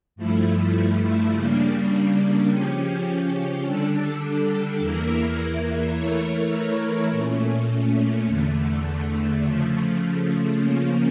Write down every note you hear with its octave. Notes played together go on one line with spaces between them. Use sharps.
G2 F3 A3 E4
C#3 G3 A#3 D4
C#3 F3 C#4 G4
D3 G3 D4 A4
E2 E3 A#3 E4 A#4
E3 A3 E4 A#4 C#5
A#2 A3 C#4
E2 D3 A3
C#3 F3 A3
C#3 F3 A#3 C#4